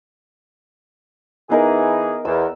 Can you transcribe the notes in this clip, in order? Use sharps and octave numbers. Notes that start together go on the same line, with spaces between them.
E3 B3 D#4 G#4 A#4
E2 E6